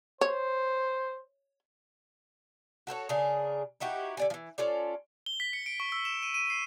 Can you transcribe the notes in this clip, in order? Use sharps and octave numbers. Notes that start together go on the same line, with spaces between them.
C5 C#5
F#4 A4 C5 C#5
C#3 D4 G#4 A#4
D#4 E4 F#4 G4
D3 D5 G#5
E3 F3
C#4 F4 A4 D5
G7
B6
C#7
D7
C#6
E6
E7
D#7
D#7
C7